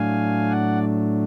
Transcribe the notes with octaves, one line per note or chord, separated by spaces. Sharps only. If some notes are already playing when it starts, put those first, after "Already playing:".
Already playing: A2 F#3 A3 D4 F5 G#5
D5 F#5